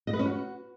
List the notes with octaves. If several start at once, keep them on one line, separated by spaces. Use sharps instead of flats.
D#5
B4
C#4
F#4